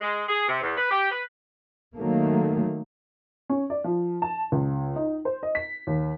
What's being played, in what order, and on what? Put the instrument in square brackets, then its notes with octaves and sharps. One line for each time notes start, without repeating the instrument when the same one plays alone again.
[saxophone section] G#3
G#4
C3
E2
B4
G4
B4
[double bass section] D#3 F#3 A3 A#3
[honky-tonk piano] C#4
D5
F3
A5
C#2
D#4
C5
D#5
B6
D#2